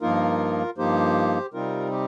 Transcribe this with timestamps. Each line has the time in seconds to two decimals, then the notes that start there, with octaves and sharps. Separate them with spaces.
0.01 G2 F3 A#3 D#4 F4 A#4
0.77 G2 F3 A#3 D#4 G4 C5
1.53 C3 G3 C4 D#4 F4 A#4
1.92 G4